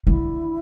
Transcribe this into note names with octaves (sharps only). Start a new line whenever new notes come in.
D3 E4